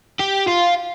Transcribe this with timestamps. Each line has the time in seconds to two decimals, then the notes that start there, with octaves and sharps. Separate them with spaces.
0.19 G4
0.48 F4